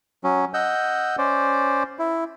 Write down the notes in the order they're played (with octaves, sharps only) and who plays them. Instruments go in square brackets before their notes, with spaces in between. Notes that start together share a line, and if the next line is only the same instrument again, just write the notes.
[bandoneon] F#3 C#4
D#5 F#5 E6 G6
C#4 C5 D5
E4